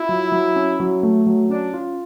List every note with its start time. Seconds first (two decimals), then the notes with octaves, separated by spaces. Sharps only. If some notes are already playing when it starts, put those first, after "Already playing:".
Already playing: E4 F4
0.09 F#3
0.32 F#3
0.56 C#4
0.80 F#3
1.03 A3
1.27 F#3
1.49 C#4 D4
1.74 F4